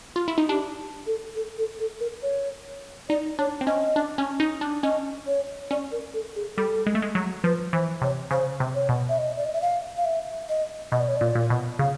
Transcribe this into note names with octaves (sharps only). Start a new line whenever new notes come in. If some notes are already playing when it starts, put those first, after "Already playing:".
F4
E4
D#4
D4 G4
A4
A4
A4
A4
A#4
C#5
D#4 D5
D4 C#5
C4
C#4 D#5
D4
C#4
D#4
D4
C#4 D#5
C#5
C#4 D5
A#4
A4
G#4
G3 A4
G#3
A3
G#3
F#3
F3 B4
E3 C5
C3 C#5
C#3 C5
C3
C#5
B2
E5
D#5
D5
D#5
E5
F5
F5
E5
D#5
B2 D#5
D5
C#5
A#2 D5
A#2
B2
C#3 F5